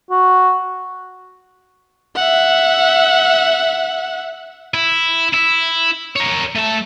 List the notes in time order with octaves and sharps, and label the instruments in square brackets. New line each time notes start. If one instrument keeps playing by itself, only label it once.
[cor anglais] F#4
[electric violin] E5 F#5
[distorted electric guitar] E4
E4
A#4 C#5
A3 A5